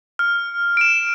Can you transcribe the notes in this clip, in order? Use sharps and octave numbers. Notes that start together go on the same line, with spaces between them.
F6
D7 E7